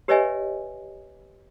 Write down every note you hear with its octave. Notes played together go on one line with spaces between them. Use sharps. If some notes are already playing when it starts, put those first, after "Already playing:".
G4 B4 C#5 D#5 E5 G#5